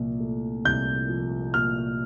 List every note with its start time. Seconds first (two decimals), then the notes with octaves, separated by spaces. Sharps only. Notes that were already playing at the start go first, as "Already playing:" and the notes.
Already playing: C2 A#2 F3
0.20 A3
0.65 C2 G6
1.09 F3
1.54 A#2 F6